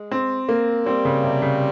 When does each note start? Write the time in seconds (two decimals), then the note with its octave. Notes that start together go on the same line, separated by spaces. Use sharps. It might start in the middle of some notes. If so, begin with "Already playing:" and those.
Already playing: G#3
0.12 C4
0.49 A#3
0.86 G3 C4
1.05 C#3
1.24 C3
1.42 C#3